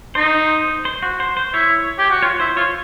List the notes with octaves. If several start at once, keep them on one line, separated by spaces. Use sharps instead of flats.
D#4 C5
C5
F#4
C5
C5
E4 C#5
G4
F#4
F4 C#5
E4 C5
F4 C#5